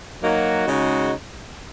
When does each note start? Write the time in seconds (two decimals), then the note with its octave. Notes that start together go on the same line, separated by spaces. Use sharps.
0.22 F#3 A#3 D#4 F#4
0.68 C#3 G#3 D#4 F#4